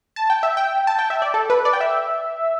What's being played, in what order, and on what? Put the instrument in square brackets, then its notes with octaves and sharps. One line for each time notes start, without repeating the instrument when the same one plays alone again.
[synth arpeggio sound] A5
G5
E5
G5
A5
G5
E5
D5
A4
B4
D5
G5
E5